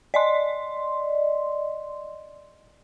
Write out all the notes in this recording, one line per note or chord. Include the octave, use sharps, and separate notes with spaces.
D5 D#5 C6